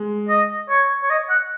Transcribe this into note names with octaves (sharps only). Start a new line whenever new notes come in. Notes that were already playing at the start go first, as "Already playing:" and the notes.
Already playing: G#3
D#5
C#5
C#5
D#5
F#5